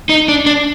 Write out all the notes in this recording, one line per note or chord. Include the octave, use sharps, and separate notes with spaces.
D#4
D4
D4